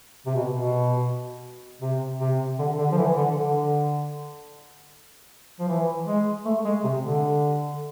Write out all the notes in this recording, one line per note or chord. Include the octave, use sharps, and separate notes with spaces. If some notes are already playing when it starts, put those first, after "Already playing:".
C3
B2
B2
C3
C3
D3
D3
F3
E3
D3
D3
F3
E3
G#3
A3
G#3
C3
D3